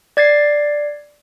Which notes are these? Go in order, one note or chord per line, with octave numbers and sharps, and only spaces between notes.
D5 G#6 A6 C7